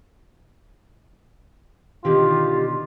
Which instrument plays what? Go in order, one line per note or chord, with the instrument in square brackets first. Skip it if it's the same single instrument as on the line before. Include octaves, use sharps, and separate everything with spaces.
[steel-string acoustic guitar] B2 D3 D#3 [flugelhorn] F4 [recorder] G4